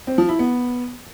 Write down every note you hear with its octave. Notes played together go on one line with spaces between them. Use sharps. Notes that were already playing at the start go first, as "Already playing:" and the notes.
C4
F3
E4
B3